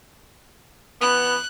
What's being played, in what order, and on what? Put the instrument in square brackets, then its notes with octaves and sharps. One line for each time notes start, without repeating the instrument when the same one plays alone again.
[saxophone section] E3 B3 [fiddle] F#6